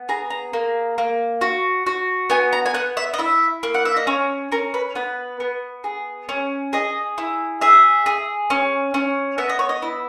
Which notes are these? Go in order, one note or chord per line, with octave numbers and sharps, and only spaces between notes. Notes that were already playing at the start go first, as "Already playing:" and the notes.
Already playing: B3
G#4 A#5
A#5
A#3
A#3
F#4
F#4
B3 G#5
A#5
G#5
B3 F#5
E5
D#5
E4 E5
A#3
F#5
E5
D#5
C#4 C#5
C#4 A#4
B4
B3 B4
B3
G#4
C#4
G#4 D#5
E4
G#4 E5
G#4
C#4
C#4
B3 E5
D#5
C#5
D#5
E4